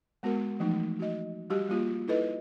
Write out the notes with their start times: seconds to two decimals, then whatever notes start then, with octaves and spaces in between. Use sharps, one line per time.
0.23 G#3 B3 F#4 A#4
0.59 E3 F3 A3 D#4
0.99 F#4 D#5
1.50 G3 F#4 G4 D#5
1.69 G3 A#3 F4 G4
2.07 D#4 E4 A4 B4 D#5